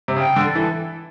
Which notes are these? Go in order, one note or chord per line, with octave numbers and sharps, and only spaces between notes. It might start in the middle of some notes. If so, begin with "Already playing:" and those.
C3
C#3 G5
D3
A4
E3